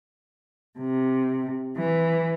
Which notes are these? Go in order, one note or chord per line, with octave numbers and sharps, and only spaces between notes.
C3
E3